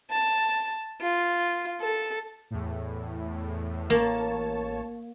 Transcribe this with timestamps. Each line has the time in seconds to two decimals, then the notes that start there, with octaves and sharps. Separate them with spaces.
0.10 A5
1.01 F4
1.81 A4
2.51 E2 A2
3.90 A1 A#3 C#5 A5